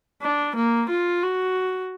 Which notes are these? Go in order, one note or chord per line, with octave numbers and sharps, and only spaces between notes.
D4
A#3
F4
F#4